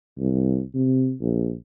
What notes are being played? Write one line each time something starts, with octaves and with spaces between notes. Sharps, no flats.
C2
C3
A#1